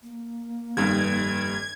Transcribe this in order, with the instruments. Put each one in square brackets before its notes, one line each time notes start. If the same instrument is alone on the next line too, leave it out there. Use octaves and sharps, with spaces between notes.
[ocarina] A#3
[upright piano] F1 G2 D#3 [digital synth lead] G#6